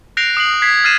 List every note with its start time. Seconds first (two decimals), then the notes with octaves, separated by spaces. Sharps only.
0.17 F#6 G6 A#6 C7 D7 F7
0.37 D#6 C7 F#7
0.62 G#6 B6 C7
0.84 F6 A6 A#6 C7 D#7 E7